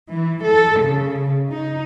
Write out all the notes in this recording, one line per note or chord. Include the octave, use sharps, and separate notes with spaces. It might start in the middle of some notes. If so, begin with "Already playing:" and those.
E3
A4
C#3
D#4